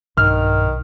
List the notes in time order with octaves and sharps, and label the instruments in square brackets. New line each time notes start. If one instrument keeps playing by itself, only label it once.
[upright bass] B1 [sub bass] G2 [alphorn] D#3 [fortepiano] F6